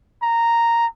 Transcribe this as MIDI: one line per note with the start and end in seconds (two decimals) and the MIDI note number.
0.22 0.86 82